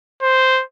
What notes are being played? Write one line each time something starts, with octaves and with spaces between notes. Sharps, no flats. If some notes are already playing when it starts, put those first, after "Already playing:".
C5